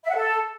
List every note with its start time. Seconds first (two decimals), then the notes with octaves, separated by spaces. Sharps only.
0.04 E5
0.09 F#5
0.15 A4